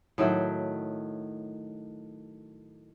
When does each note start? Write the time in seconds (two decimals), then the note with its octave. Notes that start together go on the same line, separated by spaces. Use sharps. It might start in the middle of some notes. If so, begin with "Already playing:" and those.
0.18 A2 D#3 F#3 E5